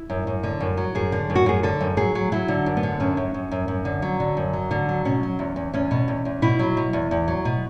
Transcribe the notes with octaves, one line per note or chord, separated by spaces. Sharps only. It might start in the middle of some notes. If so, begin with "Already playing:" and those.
Already playing: E4
F#2
F#2
D3
F#2
F#3
F#2 G#4
D3
F#2
F#4
F#2 G#4
D3 A4
F#2
F#3 G#4
F#3
F#3 E4
D3
F#2
B3
D3
F#2 C#4
F#2
F#2
F#2
F#2
D3
F#3
D3
F#2
F#3
D3
F#3
B2 C#4
F#3
E2
E2
E2 C#4
B2
E2
E2
B2 E4
F#3
B2
E2
E2
F#3
B2